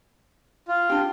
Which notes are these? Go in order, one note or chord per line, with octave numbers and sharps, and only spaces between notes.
F4
D4 G4